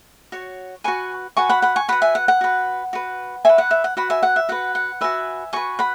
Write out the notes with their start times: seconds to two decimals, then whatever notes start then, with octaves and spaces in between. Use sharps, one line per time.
0.32 F#4 C#5
0.84 F#4 B4 G#5 C#6
1.37 F#4 B4 G#5 C#6
1.49 F#5 B5
1.62 F#5 B5
1.76 G#5 C#6
1.88 F#4 B4 F#5 B5
2.02 E5 G#5
2.15 F#5
2.28 F#5
2.41 F#4 B4
2.93 F#4 B4
3.45 F#4 B4 E5 G#5
3.58 F#5
3.71 E5
3.84 F#5
3.97 F#4 B4 F#5 B5
4.10 E5 G#5
4.23 F#5
4.36 E5
4.49 F#4 B4 F#5
4.75 F#5
5.01 F#4 B4 E5 G#5
5.53 F#4 B4 G#5 C#6
5.79 F#5 B5